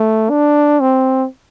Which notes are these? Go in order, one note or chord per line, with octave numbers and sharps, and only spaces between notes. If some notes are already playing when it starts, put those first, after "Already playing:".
Already playing: A3
D4
C4